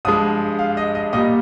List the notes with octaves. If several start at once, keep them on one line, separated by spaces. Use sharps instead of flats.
G2 F3 G#3 D#6
F5
D#5
D#5
A#2 G3 D#5